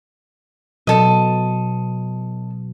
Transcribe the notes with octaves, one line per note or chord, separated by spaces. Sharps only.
B2 F#3 A4 D#5